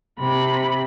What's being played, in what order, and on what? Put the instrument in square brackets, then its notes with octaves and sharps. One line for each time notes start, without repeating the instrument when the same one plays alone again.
[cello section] C3 [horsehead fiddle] B5